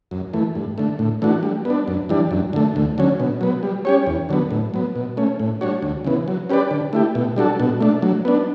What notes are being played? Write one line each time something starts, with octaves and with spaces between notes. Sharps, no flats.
F#2
E3 A3
G2
D3 A3
A2
E3 A3 D4 F#4
G3
B3 D4
F#2
E3 G3 D4
F#2
D3 A3
D2
D3 F#3 C#4
B2
F#3 B3
G3
C#4 G4 C#5
E2
D3 F#3 B3
A2
F#3 B3
B2
A3 C#4
A2
G3 D4 F#4 C#5
D2
C#3 E3 B3
F#3
C#4 G4 B4 D5
D3
A3 E4 G4
B2
G3 D4 F#4 A4
B2
A3 D4
F#3
B3 D4